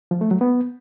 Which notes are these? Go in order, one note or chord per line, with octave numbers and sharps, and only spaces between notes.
F3
A3
F#3
B3